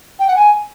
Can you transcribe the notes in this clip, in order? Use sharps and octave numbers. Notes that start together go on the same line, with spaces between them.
G5
F#5
G#5